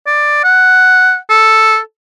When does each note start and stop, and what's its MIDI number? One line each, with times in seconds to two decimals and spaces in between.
0.07 0.41 74
0.44 1.16 78
1.29 1.78 69